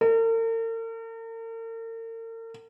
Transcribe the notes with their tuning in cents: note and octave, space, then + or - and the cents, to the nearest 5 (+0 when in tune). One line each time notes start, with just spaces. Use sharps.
A#4 -45